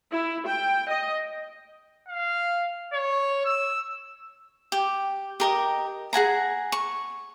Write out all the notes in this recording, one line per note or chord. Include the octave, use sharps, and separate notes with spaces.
E4
G5
D#5
F5
C#5
E6
G4
G4 A#4 D#5
G#4 F#5 G#5 A#5
C#6